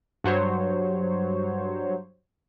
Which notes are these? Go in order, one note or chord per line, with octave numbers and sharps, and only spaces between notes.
G2 F#3 C5 C#5